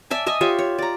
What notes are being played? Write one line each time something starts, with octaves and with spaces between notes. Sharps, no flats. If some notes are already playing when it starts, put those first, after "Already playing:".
D5 E5 G#5 A5
D#5 E5 G#5
F4 G4 C#5 E5
C#5
D5 A#5